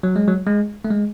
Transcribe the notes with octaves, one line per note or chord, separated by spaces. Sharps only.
F#3
G#3
F#3
G#3
A3
G#3